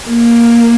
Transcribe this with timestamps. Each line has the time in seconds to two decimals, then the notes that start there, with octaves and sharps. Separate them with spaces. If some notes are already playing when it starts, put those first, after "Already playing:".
0.08 A#3